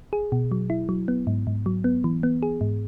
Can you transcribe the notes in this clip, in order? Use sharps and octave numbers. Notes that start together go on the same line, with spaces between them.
G#4
B2
F#3
E4
F#3
B3
G#2
G#2
F#3
B3
E3
B3
G#4
G#2